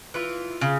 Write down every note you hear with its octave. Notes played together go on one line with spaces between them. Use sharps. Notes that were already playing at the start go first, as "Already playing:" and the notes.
E3 F4
C#3